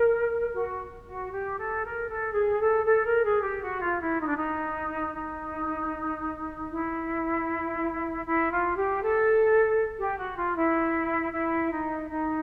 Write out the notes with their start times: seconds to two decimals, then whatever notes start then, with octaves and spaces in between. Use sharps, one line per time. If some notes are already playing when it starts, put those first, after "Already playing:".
Already playing: A#4
0.54 F#4
1.07 F#4
1.32 G4
1.58 A4
1.84 A#4
2.08 A4
2.34 G#4
2.60 A4
2.86 A4
3.05 A#4
3.24 G#4
3.43 G4
3.62 F#4
3.82 F4
4.01 E4
4.20 D#4
4.28 D4
4.36 D#4
5.16 D#4
6.71 E4
8.25 E4
8.51 F4
8.76 G4
9.02 A4
9.98 G4
10.17 F#4
10.36 F4
10.55 E4
11.32 E4
11.72 D#4
12.09 D#4